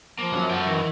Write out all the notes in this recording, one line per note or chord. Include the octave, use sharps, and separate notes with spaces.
F3 A#3
F#3 C#4
F#2 F#4 A4 G5
D#3 E3